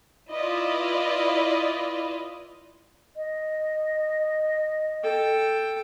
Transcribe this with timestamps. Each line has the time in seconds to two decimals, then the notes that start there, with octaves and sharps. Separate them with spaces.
0.32 E4 F4 B4 D5 D#5
3.16 D#5
5.03 A4 G5